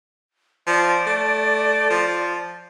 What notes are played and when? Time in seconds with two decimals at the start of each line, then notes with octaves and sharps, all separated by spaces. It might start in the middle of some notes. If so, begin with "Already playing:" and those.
0.67 F3 D5
1.07 A3
1.90 F3